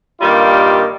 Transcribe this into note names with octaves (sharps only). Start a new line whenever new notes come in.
G2 D#3 G3 A#3 F4